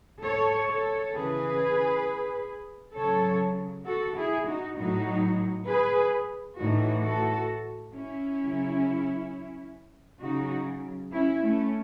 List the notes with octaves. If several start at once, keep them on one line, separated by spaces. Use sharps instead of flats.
A4 C#5
A4 C#5
C#3 E3 G#4 B4
C#3 F#3 A4 C#5
F#4 A4
E4 G#4
D#4 F#4
A2 F#3 D#4 F#4
G#4 B4
A2 E3 D#4 F#4
F#4 A4
C#4 E4
C#3 F#3
C#3 F#3 D#4 F#4
C#4 E4
A3 C#4